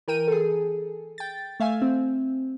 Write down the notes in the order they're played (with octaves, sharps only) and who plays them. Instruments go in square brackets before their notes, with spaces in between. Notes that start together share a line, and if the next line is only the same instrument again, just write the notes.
[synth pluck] E3 A#4 G5 D#7
G#4 A4
G5 A6
A3 E5 F5 G#5
C4